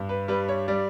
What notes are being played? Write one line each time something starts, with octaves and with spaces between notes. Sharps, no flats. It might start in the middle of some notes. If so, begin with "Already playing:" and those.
Already playing: G2
B4
G3 B4
C#5
G3 D5